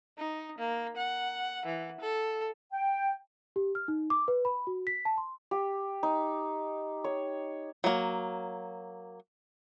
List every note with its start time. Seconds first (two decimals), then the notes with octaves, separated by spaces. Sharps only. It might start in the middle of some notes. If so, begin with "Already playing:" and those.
0.18 D#4
0.58 A#3
0.97 F#5
1.66 E3
2.00 A4
2.73 G5
3.56 G4
3.75 F6
3.88 D#4
4.10 D6
4.28 B4
4.45 B5
4.67 F#4
4.87 B6
5.05 A5
5.18 C6
5.51 G4
6.03 D#4
7.04 C#5
7.84 F#3 A#3